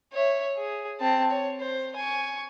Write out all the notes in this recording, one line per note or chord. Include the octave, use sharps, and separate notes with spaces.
C#5 E5
G#4
C4 A5
C#5
C5
G#5 C#6